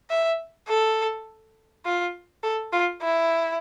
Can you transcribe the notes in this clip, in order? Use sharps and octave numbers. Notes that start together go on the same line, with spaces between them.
E5
A4
F4
A4
F4
E4